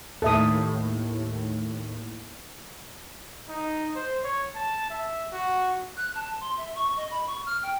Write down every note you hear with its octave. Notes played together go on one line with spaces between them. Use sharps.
D#2 A2 A4 E5 D#6
D#4
C5
C#5
A5
E5
F#4
F#6
A5
C6
E5
C#6
D#5
B5
C#6
F6
G5